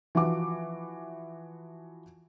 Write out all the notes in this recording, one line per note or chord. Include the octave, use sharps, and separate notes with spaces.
E3 F3 F#4 D6